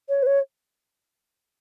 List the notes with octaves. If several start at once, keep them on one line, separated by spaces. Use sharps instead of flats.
C#5
B4
C#5